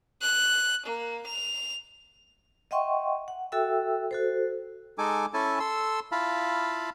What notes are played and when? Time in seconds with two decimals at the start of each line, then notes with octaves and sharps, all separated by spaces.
0.22 F#6
0.86 A#3
1.27 F7
2.71 D#5 E5 F#5 G5 C6 C#6
3.28 F#5
3.52 F#4 A4 E5 G5 E6
4.11 F#4 A4 C5
4.98 G#3 D#4 A4 G#5 D6
5.34 C#4 E4 A4 G#5 A5
5.60 A4 C6 E6
6.12 E4 F4 F5 A5 B5